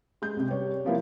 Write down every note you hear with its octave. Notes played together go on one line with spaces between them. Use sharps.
G#3 G6
C2 C3
G3 C#5
C3 F3 A#3 E4